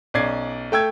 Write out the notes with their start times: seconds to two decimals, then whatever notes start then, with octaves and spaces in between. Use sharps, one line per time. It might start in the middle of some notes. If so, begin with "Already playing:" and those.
0.14 B1 C#4 D5 G#6 C7
0.72 A3 G5 E6 G#6